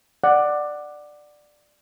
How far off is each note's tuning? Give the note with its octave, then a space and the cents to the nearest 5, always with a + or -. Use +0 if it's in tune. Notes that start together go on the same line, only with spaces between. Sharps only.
D5 +10 F#5 +0